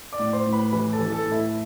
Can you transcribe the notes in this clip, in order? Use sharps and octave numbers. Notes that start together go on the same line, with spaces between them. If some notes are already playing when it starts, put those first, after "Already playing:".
D5 D6
A2
C5 C6
A2
B4 B5
E3 B4 B5
A4 A5
E3
A4 A5
A2
E4 E5